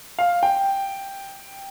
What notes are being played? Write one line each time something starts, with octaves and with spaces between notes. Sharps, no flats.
F5
G5